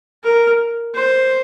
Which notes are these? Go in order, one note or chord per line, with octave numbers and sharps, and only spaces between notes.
A#4
C5